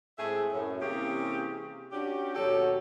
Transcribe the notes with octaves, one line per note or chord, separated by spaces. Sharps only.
A2 G#3 A3 C4 G#4 E5
F#2 A2
C3 E3 A#3 C#4 G4 G#4
C#4 D4 F#4 G4
D#2 B2 F#3 F#4 G4 A4